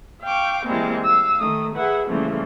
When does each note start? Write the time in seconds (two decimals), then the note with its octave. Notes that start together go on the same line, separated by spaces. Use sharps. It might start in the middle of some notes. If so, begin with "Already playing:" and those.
0.23 F5 G5 C#6 D6
0.65 E3 G3 G#3 A#3 C4
1.04 F5 E6
1.38 D#3 A3 D#6
1.76 G#4 B4 E5 F#5
2.07 C#3 E3 F3 G3 A3 A#3